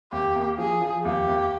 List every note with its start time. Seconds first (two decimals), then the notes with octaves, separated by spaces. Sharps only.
0.12 D#2 G4
0.36 A#3
0.58 F3 G#4
0.81 F3
1.05 D#2 G4
1.28 D#2